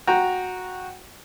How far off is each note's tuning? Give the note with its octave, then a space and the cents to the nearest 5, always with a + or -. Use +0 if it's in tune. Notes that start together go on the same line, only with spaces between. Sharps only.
F#4 -10 G5 +0 A#5 +0